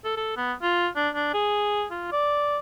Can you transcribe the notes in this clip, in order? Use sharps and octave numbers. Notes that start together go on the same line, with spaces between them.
A4
A4
B3
F4
D4
D4
G#4
F4
D5